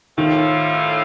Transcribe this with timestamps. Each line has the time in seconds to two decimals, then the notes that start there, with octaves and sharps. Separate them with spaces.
0.17 A2 D#3 F3 A3 C#4 F4